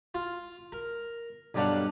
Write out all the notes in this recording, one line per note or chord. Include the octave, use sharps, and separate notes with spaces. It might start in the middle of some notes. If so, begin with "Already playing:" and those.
F4
A#4
B1 G2 G3 D4 F5 F#5